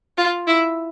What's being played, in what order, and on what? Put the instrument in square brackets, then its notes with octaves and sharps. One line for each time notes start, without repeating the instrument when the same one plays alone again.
[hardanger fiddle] F4
E4